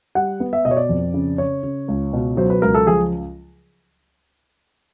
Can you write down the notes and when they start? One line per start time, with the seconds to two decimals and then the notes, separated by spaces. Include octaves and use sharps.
0.15 G3 F#5
0.40 B3
0.53 E5
0.65 B2 D#5
0.71 C#5
0.77 D5
0.89 F2
1.14 C#3
1.38 C#3 C#5
1.63 C#3
1.88 C#2
2.13 B2
2.37 F#3 C5
2.50 B4
2.62 C#2 A#4
2.74 A4
2.87 F3 G#4